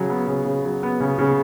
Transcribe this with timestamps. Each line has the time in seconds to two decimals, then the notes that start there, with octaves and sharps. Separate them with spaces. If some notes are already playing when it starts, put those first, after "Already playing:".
Already playing: C#3 F#3
0.10 B3
0.27 C#3
0.45 C#3
0.65 F#3
0.83 B3
1.00 C#3
1.18 C#3